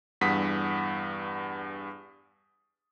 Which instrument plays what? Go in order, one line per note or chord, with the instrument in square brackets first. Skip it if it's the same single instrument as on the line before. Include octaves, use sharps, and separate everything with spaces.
[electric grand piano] E2 G2 F#5 D#6 B6